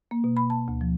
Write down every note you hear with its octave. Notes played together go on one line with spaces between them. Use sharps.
A#3
B2
B5
A5
D2
F3